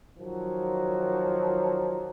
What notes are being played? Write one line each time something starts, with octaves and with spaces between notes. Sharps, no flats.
D#3 F3 F#3